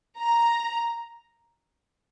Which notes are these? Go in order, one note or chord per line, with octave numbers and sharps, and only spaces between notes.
A#5